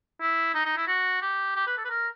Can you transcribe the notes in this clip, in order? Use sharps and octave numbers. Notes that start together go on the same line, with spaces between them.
E4
D#4
D#4
E4
F#4
G4
G4
B4
A4
B4
A#4